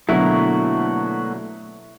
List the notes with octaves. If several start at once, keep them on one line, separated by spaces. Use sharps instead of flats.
B2 D3 F#3 A3 A#3 E4 F#4